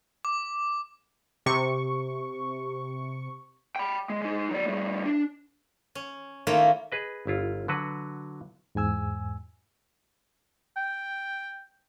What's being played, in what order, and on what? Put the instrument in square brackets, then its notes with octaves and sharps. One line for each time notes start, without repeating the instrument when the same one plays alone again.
[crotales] D6
[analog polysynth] C3 C#6
[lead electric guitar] G5 B5
G#3
G#3 D#4
F#3 D5
A2 G3
D4
[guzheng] C#4
D#3 A3 A#3 C#4 E4 F4
[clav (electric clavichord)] G#4 B4 D#5
G1 E4 F4
D3 F#3 F#4 B4
[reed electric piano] E2 G#2 G#5 E6
[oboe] G5